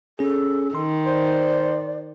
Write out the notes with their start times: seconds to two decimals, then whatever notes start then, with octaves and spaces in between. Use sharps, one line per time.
0.19 C#4 G#4 A4
0.75 D#3 C6
1.06 C5 D5